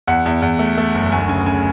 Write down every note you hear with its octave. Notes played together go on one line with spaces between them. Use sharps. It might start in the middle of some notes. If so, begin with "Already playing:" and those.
E2 F#5
E2
E2
A3
A3
F#1
D2 G#5
C#3 G#5
C#3 G#5